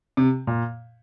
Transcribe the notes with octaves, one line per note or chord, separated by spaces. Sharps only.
C3
A#2